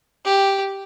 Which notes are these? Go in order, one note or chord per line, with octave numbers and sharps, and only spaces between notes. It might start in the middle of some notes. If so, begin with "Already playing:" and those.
G4